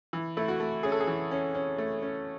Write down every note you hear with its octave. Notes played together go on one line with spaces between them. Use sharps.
E3
A3 E4
F#4
A3
C#4 G#4
A4
G#4
E3
C#4
C#4
A3
C#4